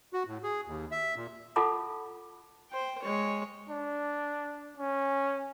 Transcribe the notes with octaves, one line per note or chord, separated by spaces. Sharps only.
F#4
A2
G#4
D#2
E5
A#2
F4 A4 F#5 A5 B5 D6
C5 G5
G#3 C#5
D4
C#4